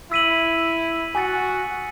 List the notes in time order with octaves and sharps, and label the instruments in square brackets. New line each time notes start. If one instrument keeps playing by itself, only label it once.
[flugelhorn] E4 [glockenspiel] E6 B6 D#7 F#7
[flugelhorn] F#4 [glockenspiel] G#5 D#6 A6 C#7